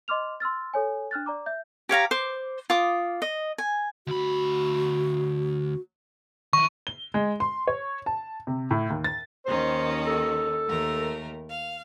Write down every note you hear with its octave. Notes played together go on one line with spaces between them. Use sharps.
D#5 C6 D6 F6 F7
C6 E6 F6 A6
A4 C#5 G#5
D4 F6 F#6 A6
D5 A#5 D6
E5 G6
G4 C#5 F5 A#5
C5 D6
F4 D6 D#6
D#5
G#5
D2 F#4 B5
D#3 E4 C#6
G7
G#3
C6
C#5
A5
C3
A2
D#2
A6
D#2 D#3 C#4 C5
A4
D#2 A3 A#4
F5